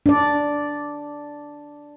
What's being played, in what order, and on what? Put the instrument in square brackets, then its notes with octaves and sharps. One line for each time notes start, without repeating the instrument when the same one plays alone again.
[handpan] D4 D5